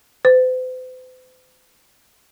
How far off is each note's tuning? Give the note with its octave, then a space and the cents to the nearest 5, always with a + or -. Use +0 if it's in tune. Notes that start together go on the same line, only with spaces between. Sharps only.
C5 -45